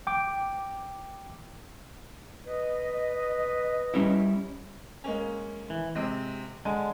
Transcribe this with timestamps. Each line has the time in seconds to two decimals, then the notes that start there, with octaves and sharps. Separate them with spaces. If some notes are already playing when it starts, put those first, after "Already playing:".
0.07 G5 D6
2.46 B4 D#5
3.94 G3 C#4 E4
5.04 G#3 A#3 C#4
5.70 E3
5.95 C3 G#3 C4
6.65 D3 G#3 G#5